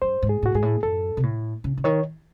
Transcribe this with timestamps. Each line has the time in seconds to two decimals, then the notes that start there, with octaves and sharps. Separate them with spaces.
0.02 F#2 C5
0.22 G#2
0.29 G#4
0.43 A2 F#4
0.54 G#2 G#4
0.62 A2
0.83 F#2 A4
1.17 C3
1.23 A2
1.64 C#3
1.77 C#3
1.84 D#3 C#5